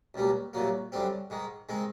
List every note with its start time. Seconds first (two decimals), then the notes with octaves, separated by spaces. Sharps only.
0.14 C#2 B2 G3 A#3
0.53 C2 A#2 F#3 A#3
0.92 F#2 D3 G3 C4
1.30 G#2 D#3 G#3
1.69 D#3 G#3 C4